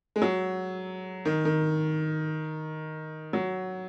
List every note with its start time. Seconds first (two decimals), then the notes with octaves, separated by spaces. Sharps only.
0.16 G#3
0.22 F#3
1.25 D#3
1.45 D#3
3.33 F#3